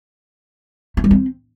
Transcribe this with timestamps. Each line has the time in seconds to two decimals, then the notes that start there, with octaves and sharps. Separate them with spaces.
0.97 A3
1.04 G3
1.11 C4